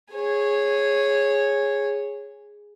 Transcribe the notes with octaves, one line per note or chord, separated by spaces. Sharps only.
G#4 C#5